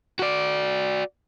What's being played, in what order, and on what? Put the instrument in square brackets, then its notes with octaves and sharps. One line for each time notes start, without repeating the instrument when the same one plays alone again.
[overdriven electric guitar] F#4 D5